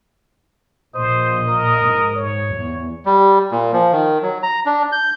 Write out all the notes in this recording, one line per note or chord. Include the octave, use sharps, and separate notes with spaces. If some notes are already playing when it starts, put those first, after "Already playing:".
A#1 A#2 C5 D#5
A#4
G#2
C#5
E2
G3
A#2
F3
D#3
F#3
A#5
D4
G6